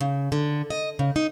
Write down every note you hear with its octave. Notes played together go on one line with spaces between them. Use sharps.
C#3
D3
D#5
C#3
D#4